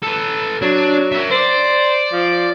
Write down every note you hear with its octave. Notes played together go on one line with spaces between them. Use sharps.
A4 B4
F#3 D4
A#4 E5
C5 D5
F3